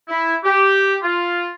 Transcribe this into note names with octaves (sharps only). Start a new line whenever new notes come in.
E4
G4
F4